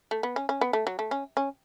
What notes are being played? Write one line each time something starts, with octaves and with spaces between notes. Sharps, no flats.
A3
B3
C#4
C#4
B3
A3
F#3
A3
C#4
C#4